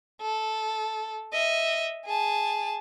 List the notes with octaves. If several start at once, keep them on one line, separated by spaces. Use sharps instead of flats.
A4
D#5 E5
G#4 A5